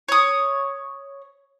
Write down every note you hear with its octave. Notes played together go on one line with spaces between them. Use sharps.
C#5 D#6